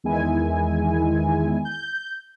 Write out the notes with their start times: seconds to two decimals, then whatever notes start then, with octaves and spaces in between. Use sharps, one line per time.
0.04 E2 D#3 G#3 E4 G#5
1.65 G6